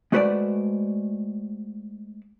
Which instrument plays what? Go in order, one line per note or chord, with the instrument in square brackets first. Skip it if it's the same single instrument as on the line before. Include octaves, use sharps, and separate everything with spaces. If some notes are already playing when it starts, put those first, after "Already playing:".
[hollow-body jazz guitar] G#3 A3 F#4 B4 C5 D5